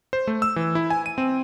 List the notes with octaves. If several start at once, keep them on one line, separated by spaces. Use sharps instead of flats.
C5
A3
E6
E3
E4
G#5
D#7
C4